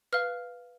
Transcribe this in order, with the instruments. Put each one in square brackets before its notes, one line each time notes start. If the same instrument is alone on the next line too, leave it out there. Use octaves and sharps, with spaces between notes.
[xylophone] B4 F5 F6